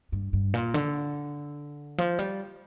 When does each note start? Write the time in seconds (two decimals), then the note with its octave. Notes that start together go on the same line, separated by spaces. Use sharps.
0.12 G2
0.33 G2
0.54 A#2
0.74 D3
1.98 F3
2.19 G3